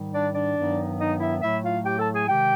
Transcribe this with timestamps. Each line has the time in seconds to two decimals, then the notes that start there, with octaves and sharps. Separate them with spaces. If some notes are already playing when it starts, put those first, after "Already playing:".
Already playing: G#2 D#3 G3
0.13 D4 D5
0.34 D4 D5
0.56 G2 D#3 F#3 B3 D#4
0.99 D#4 D#5
1.20 E4 E5
1.42 A2 F#3 A3 E4 E5
1.64 F4 F5
1.85 G4 G5
1.99 A4 A5
2.14 G#4 G#5
2.28 C3 D#3 G#3 G4 G5